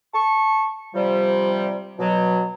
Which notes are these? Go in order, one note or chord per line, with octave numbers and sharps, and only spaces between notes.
A5 C#6
C3 F3 G3
B2 F#3